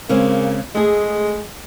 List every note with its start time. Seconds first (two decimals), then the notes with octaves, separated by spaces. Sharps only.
0.09 C#3 G#3 A#3 C4
0.74 G#3 A3 G#4